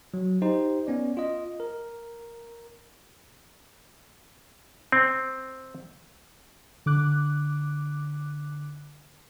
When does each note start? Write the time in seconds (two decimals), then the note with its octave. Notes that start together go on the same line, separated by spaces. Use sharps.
0.14 F#3
0.42 D#4 G4 C5
0.87 B3 C#4 D5
1.17 F4 D#5
1.60 A#4
4.92 C4
6.86 D3 D6 F#6